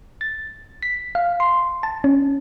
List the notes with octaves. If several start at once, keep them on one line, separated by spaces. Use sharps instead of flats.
A6
B6
F5
C6
A5
C#4